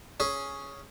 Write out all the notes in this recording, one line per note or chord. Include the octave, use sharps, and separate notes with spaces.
C#4 G#4